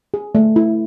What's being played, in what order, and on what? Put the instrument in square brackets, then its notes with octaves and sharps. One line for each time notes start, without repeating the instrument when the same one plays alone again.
[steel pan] G#4
A3
E4